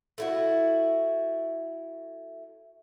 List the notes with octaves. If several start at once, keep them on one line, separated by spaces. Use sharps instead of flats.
A3 E4 F#4